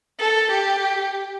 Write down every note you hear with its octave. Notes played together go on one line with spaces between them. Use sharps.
A4
G4